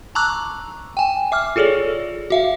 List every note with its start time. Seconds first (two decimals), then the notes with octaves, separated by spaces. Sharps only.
0.15 A5 A#5 C#6 D6 E6 F#6
0.97 G5 G#5
1.32 E5 D6 F6
1.56 F4 G#4 A4 C#5 D5
2.30 F#4 E5 F5